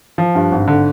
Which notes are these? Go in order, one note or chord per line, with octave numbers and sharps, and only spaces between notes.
F3
G2
G#1
D3